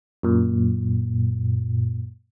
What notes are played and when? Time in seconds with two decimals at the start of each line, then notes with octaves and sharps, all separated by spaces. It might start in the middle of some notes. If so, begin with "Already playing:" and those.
0.23 F#2 A#2